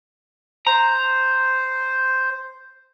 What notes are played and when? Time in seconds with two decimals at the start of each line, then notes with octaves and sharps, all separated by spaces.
0.67 C5 A#5